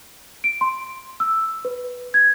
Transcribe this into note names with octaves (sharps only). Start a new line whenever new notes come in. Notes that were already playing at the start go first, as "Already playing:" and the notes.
D7
C6
E6
B4
G#6